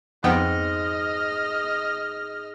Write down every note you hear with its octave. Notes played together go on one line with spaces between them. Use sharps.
F2 G#2 B3 D#5 G5 F6